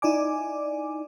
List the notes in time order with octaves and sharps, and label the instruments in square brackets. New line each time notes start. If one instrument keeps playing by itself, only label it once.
[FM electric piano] D#4 E4 D5 G#5 D6